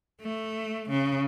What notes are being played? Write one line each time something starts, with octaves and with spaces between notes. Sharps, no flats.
A3
C#3